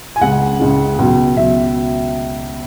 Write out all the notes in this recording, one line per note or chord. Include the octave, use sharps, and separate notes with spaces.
G#5
C#2 C#3 G#3 F#5
C#2 C#3 G#3
C#2 B2 F#3
C#2 B2 F#3 E5